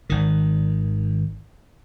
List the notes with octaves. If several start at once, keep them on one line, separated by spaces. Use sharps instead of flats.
G#1 D#3